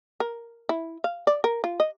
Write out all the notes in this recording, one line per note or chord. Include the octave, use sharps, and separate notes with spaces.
A#4
E4
F5
D5
A#4
F4
D#5